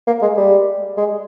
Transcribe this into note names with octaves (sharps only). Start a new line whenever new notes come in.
A#3
G#3
G3
G#3